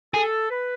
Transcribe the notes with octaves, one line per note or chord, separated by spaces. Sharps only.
G#4 A4
B4